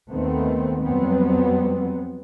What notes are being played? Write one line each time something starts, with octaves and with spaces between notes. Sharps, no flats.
D#2 D#3 A3 B3 C4
F2 F#3 G3 B3 C4